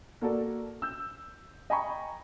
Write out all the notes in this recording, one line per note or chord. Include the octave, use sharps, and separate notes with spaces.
A#3 F#4 A4 D5
E6 G6
D#5 G5 G#5 A#5 B5 C#6